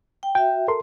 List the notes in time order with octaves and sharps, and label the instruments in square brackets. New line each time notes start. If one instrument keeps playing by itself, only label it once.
[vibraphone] G5
[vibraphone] F#4 E5 [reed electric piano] G5
[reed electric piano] A4 A#4 C6